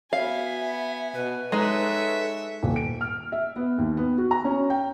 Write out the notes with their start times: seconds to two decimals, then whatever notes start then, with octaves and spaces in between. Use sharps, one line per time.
0.13 B3 F#4 E5 F5 G#5
1.14 B2 B4
1.52 G#3 D#4 A4 C#5 E5
2.63 D#1
2.76 D7
3.01 F6
3.32 E5
3.56 B3
3.78 D#2
3.97 B3
4.18 F#4
4.31 A#5
4.45 C#4
4.70 G5